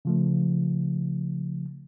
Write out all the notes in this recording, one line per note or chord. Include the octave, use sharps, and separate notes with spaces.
C#3 F3 A3